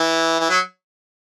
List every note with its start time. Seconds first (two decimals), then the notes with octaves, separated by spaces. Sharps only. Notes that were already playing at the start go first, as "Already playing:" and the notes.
Already playing: E3
0.40 E3
0.50 F#3